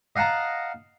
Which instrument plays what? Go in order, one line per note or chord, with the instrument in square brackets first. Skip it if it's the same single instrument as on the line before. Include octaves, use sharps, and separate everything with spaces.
[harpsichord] D#5 F5 F#5 A5 A#5